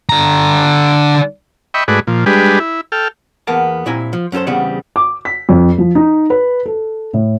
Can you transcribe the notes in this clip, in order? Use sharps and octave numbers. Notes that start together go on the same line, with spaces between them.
D3 A#5
D#5 E5 G5 B5 C#6
G#2 A3 F#4 G#4 B4 D5
A#2 F3
G3 G#3 D4 G4 G#4 B4
E4
A4 G5 F6
E2 A#3 B3 A#4 F#5 A5
A#2 C4 E4 G4 G#5 A#5
F3
F#2 C#4 F4 A4 C5
E2 C#3 G3 B3 C4 F#5
D6
B6
F2
F3
D#4
B4
A4
A2